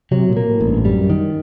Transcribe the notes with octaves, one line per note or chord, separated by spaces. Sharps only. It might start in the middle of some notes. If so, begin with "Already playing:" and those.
C3 F#3
A#2
A#3
A2
A1
G2
F#2 G3
D#3